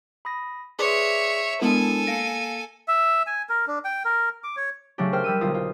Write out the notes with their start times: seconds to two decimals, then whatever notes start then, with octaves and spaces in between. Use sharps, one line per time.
0.25 B5 D#6 A#6
0.79 G#4 B4 C#5 D5 E5 C6 D6
1.61 G#3 B3 D4 E4 A4 A#4 G#5
2.07 A#3 F5 A#6 C#7 D7
2.88 E5
3.27 G#5
3.49 A#4
3.68 D4
3.85 G5
4.05 A#4
4.44 D6
4.56 C#5
4.98 C#3 F#3 A3 D4 G4
5.13 A#4 C5 G5 F6
5.24 G3 E6 D#7
5.41 B1 D3 F4 D#6
5.54 F4